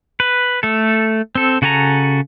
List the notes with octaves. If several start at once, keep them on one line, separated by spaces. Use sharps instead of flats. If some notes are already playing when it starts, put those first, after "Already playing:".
B4
A3 A4
C4 A4
C#3 F#4 A4 G#5 A#5